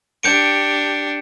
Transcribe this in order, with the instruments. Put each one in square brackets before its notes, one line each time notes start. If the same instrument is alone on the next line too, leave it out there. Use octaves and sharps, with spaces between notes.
[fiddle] D4 G4 [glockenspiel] G6 C#7 D7